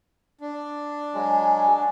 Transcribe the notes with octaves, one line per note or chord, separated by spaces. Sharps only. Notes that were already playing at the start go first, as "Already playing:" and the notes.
D4
F#3 G#3 G#5